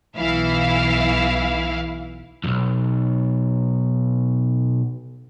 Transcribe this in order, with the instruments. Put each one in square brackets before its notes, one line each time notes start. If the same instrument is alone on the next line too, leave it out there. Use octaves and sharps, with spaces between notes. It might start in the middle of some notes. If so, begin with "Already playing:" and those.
[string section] B1 E3 E4 F5
[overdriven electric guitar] B1 F2